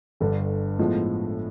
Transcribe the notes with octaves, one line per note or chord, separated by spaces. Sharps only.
G1 G2 D3
A2 F3 G#3 B3